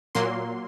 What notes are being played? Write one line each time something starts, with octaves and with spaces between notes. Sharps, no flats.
A#2 F#3 A#3 C6